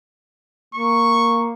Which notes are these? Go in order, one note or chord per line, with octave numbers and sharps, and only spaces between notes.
A#3 C#6